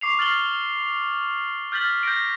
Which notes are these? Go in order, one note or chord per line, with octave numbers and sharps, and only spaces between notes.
C#6 D6 C7 F7
C#6 F6 A6 C7 F#7 G7
F6 G6 A6 B6 F#7
G6 A#6 D7